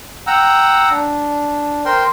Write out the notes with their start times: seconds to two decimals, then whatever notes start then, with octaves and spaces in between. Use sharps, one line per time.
0.27 F#5 G5 A#5 E6
0.90 D4
1.85 A#4 C5 G5 C6